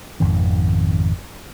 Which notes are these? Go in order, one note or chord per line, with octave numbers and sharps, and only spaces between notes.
G#1 F2 B2 D#3